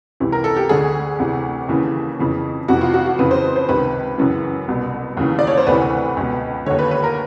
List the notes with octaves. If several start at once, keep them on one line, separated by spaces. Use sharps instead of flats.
C#2 C3 E3
A#4
A4
G4
D2 D3 G#4
D2 C3 E3
D#2 C#3 E3
F2 C#3 E3
F2 C3 E3 F#4
F4
F#4
F#4
F2 C#3 E3 B4
C5
C5
C#2 C3 D#3 B4
F#2 C#3 E3
C2 B2
D#2 C#3 E3
D5
C#5
C5
D2 C3 E3 B4
C#2 B2
D#2 D3 C#5
B4
B4
A#4